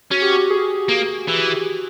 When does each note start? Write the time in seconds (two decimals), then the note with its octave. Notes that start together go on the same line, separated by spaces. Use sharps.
0.11 C#4 F#4
0.22 G4
0.32 F#4
0.50 G#4
0.89 A#3
1.28 E3